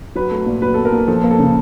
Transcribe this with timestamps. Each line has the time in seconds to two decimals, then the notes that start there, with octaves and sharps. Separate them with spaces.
0.16 F#3 B4
0.31 A3
0.46 A#2
0.62 F#3 B4
0.74 B3 A4
0.85 A#4
0.92 A#2
1.08 F3 A4
1.24 A#3
1.31 A4
1.39 C#3